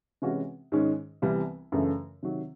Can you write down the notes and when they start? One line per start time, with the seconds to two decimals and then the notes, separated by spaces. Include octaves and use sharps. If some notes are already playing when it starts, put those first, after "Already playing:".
0.22 C3 E3 G#3 C#4 F#4
0.72 G#2 D#3 G#3 C#4
1.22 C2 C3 E3 G3 B3
1.72 F#2 C#3 E3 A3 D4
2.23 C3 D#3 F#3